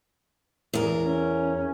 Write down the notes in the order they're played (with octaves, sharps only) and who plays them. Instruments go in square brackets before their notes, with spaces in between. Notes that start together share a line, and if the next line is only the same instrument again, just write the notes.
[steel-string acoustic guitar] E2 A#4
[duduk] C#4